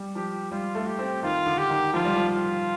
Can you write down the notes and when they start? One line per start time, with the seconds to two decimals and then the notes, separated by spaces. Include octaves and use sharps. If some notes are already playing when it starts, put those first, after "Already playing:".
Already playing: G3
0.15 F3 G4
0.51 G3 F4
0.75 A3
0.87 G4
0.99 C4
1.23 D#3 F4
1.46 D3
1.58 G4
1.70 D#3
1.94 F3 F4
2.05 G3
2.16 F3
2.29 F4